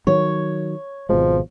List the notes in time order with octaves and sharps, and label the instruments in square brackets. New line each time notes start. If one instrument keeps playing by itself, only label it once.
[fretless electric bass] D#3 F#3 [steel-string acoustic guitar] C#5
[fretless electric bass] G#1 B2 G#3 [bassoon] F3